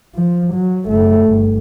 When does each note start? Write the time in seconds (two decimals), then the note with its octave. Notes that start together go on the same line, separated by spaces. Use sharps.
0.15 F3
0.53 F#3
0.87 F#1 A3
1.25 G1